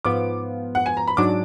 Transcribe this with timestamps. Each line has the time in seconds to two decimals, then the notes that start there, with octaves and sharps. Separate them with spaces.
0.04 G#2 F3 B3 F4 D6
0.75 F#5
0.86 G#5
0.97 A#5
1.08 B5
1.17 G#2 F#3 D4 D6